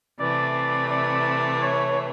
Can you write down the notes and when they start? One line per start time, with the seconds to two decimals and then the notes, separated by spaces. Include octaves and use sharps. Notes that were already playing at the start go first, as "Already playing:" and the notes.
0.19 C3 E3 A3 D5
0.90 D5
1.61 C#5